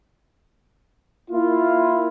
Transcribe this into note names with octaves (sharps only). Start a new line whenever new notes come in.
A#3 E4 F4